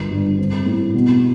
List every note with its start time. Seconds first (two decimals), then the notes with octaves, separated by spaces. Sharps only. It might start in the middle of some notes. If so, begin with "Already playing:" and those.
Already playing: G1
0.11 G2
0.38 C4
0.66 A2
0.94 B2